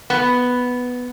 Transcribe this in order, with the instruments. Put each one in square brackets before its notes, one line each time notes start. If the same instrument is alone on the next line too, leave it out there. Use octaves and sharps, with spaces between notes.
[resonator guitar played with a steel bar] B3